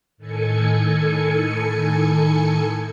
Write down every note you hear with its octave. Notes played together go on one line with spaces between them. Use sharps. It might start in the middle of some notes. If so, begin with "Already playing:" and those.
A2 D#3 A4 G#5 C#7